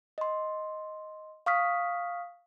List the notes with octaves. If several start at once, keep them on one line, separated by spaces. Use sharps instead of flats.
D#5 C6
F5 C#6 D#6 F6 B6